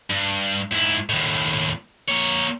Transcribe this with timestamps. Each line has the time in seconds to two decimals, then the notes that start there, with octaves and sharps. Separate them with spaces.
0.10 G2
0.73 G#2 E4
1.10 D#2 A2
2.08 A#3 C#5